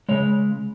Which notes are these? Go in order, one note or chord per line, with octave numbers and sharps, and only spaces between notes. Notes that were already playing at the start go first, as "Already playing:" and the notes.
C#3 G#3 C#5